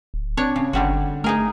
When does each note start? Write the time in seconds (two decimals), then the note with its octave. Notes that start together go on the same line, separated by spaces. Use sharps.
0.14 D1
0.37 C4 D4 C#5
0.56 C#3
0.73 G1 D3 G3 F#4
1.24 A3 D#4 G#4 A#4